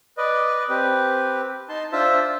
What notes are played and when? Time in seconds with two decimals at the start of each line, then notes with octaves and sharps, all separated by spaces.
0.18 B4 D5 D#5
0.69 C4 G4 B4
1.69 D#4 A5 C6
1.92 D4 F4 C5 E5 A5